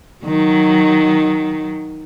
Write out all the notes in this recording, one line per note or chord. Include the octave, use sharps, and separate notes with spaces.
D#3 F#3